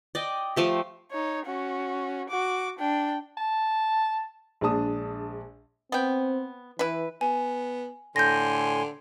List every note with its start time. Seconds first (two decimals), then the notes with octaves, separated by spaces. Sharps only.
0.15 D5 D#5 G5
0.56 F3 A3 G4
1.11 D#4 C#5
1.45 C#4 F#4
2.29 F#4 D6
2.79 D4 G5
3.37 A5
4.61 A#1 G#3 D4 A5 D#6
5.92 B3 C4 G5
6.79 E3 E4 B4
7.21 B3 G#5
8.16 A2 D3 G#5 C6 G6 A#6